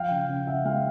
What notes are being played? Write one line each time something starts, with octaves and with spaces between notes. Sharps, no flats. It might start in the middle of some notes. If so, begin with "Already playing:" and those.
Already playing: F3 F5 G5
C#3
C#3
C#3 E5 F#5
G#3 F5 G5